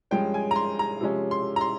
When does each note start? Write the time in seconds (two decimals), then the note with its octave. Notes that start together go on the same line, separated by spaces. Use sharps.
0.11 G2 F3 G#3 C#4 G5
0.34 G#5
0.51 A#5
0.56 C6
0.79 A#5
1.01 C3 F3 G#3 C#4
1.31 C6
1.56 A#5
1.61 C6